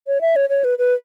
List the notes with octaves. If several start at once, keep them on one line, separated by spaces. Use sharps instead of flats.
C#5
E5
C#5
C#5
B4
B4